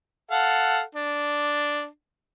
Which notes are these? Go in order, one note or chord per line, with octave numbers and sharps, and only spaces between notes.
A4 F5 F#5
D4